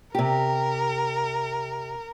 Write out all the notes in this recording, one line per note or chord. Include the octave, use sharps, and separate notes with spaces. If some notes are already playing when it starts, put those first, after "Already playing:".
C3 G4 A#4